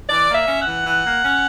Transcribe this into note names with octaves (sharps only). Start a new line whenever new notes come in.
E3 D5
A#3
E5
C#4
F#5
E3
E3
A#3
C#4